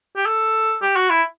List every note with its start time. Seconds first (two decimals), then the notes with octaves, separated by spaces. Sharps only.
0.17 G4
0.26 A4
0.82 G4
0.96 F#4
1.10 E4